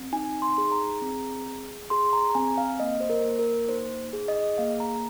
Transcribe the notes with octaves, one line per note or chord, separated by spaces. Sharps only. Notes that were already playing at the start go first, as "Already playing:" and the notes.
Already playing: C4
D#4 G#5
C6
G#4
A#5
C4
G#4
G#4 C6
A#5
A#5
C4 G#5
F5
A#3 D#5
C5
A#4
A#3
A#4
D#4 C5
G#4
D#5
A#3 F5
A#5